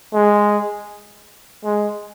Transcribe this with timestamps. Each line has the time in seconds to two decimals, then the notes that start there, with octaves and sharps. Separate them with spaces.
0.13 G#3
1.64 G#3